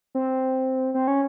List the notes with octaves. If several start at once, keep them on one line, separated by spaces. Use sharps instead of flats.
C4
C4
C#4